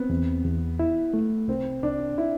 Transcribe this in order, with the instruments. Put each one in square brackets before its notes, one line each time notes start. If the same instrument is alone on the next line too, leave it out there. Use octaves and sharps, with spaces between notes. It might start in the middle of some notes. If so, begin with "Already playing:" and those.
Already playing: [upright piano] B3 [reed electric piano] C4
[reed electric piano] E2
E2
E4
A3
[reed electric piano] C2 [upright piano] C4
[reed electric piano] C2 [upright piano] D4
[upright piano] E4